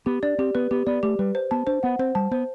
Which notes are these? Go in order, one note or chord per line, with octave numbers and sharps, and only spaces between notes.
B3 G4
D4 D5
C4 G4
B3 B4
B3 G4
B3 D5
A3 G4
G3 B4
C5
B3 A5
D4 C5
B3 F#5
C4 C5
G3 A5
B3 C5